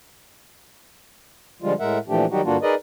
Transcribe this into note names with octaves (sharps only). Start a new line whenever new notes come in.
D3 F3 G3 G#3 F4
A2 G#3 A#4 E5 F#5
A#2 E3 F3 A3 D4 G4
D#3 F#3 G3 D#4 F#4 G4
G2 D3 A#3 D4 F4 F#4
D#4 G#4 A#4 B4 D5 D#5